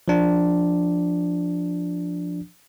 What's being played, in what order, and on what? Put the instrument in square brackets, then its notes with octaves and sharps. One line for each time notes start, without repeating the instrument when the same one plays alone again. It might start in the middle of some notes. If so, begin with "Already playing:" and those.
[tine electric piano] F3 D4